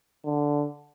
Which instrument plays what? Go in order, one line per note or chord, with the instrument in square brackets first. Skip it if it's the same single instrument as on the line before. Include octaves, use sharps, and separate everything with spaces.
[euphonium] D3